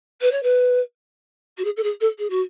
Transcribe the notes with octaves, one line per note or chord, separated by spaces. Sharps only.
B4
C#5
B4
F#4
G#4
A4
G#4
A4
G#4
F#4